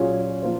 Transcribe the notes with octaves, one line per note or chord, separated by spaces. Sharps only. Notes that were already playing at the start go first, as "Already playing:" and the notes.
Already playing: A#2 F#3 C#4 G#4
F3 A#3 F4 C5